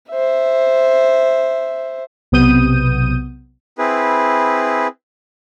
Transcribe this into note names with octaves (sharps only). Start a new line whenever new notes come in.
C5 E5
B1 C3 B3 D#6 G6 D#7
C4 E4 G#4 B4